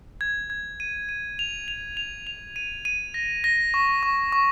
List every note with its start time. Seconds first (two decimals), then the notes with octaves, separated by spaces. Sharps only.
0.21 G#6
0.50 G#6
0.80 D#7
1.09 D#7
1.39 F7
1.68 F7
1.97 F7
2.27 F7
2.56 D#7
2.85 D#7
3.14 A#6
3.44 A#6
3.74 C#6
4.03 C#6
4.32 C#6